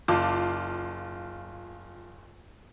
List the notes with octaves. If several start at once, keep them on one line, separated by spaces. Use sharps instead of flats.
F#1 F4 A5 D6